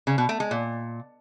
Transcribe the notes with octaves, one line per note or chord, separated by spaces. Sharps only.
C#3
B2
A3
G#3
A#2